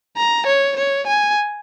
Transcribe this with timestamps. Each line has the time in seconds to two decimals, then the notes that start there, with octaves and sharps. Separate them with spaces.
0.17 A#5
0.47 C#5
0.77 C#5
1.07 G#5